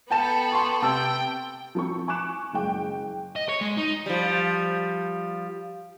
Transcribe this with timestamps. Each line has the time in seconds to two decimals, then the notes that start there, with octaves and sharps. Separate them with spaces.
0.11 B3 A4 G5 A5 E7
0.52 C6 C#6
0.82 C3 G5 A5 E6
1.75 F3 C4 C#6
2.08 G#5 C#6 D6 F#6 E7
2.53 F#1 G#3 G5
3.36 D#5
3.49 C#5
3.61 G#3
3.78 D#4
4.06 F3 G3